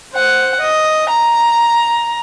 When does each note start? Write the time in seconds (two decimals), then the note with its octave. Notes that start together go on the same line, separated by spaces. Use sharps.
0.13 C5 F#5
0.60 D#5
1.09 A#5